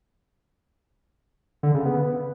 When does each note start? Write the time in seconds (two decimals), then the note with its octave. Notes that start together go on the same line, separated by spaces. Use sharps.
1.63 D3
1.74 C#3
1.86 B3